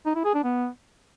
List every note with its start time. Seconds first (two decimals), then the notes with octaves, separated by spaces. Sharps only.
0.06 D#4
0.15 E4
0.25 G#4
0.34 D4
0.44 B3